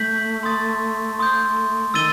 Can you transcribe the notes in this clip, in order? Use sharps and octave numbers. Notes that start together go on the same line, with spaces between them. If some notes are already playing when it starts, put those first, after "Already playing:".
Already playing: A3 G6 B6 F#7
C6 D#6 A6
C6 D#6 G6
D#3 E6 A6 D#7 G7